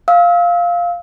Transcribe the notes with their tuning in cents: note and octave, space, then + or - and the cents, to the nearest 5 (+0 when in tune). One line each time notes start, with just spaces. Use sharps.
F5 +0 E6 -35